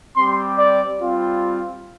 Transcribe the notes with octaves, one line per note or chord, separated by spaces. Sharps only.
G3 C4 G4 C6
D5
G3 C4 F4